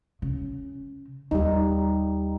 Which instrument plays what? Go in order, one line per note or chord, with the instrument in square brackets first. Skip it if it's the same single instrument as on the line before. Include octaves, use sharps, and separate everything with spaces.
[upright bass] C#3
[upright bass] D#2 [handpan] G3 D#4